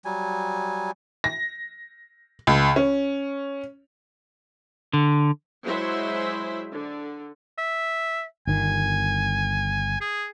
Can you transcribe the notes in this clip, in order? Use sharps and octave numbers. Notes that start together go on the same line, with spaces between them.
F#3 G3 G#5
A#6
C#2
C#4
D3
F#3 G#3 E4 G#4 C5 E5
D3
E5
G1 D#3 G#5
G#4